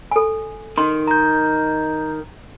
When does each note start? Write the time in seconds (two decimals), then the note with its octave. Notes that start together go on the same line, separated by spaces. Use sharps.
0.11 A4 G#5
0.78 D#3 C6
1.07 A#5 G6